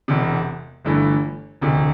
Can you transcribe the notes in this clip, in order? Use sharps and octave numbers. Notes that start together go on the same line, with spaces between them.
E1 E2 C3
G1 G2 E3 A3
E1 D2 C3